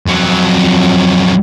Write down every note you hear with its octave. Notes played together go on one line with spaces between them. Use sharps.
F2 F#3